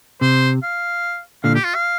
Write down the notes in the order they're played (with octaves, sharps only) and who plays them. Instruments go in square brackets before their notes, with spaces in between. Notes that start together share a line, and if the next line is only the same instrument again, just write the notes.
[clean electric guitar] C3 [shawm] C5
[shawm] F5
[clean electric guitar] A#2 D3 [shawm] F5
[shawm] G4
F4
F5